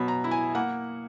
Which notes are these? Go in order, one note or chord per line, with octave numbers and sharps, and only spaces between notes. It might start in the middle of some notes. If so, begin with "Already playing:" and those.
Already playing: B2 F#3 B5
A#5
E4
G#5
A#3 F#5